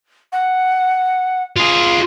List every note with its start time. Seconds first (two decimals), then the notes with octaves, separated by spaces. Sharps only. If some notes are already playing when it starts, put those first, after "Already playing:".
0.32 F#5
1.56 F4 G#4